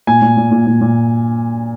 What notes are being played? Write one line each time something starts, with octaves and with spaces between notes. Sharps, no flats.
A#2 G#5
A#2
A#2
A#2
A#2
A#2